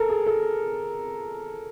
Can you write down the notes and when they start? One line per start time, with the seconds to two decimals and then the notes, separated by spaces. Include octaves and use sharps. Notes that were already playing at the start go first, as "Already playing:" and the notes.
Already playing: A4 A#4
0.09 G#4
0.27 A4